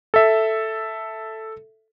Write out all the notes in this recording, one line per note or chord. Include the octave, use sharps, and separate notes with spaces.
A4 E5